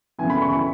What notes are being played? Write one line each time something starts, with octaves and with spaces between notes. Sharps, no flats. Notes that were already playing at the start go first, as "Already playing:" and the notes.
F#2 C#3 E3 B3 G#5
B5
C#6
C#6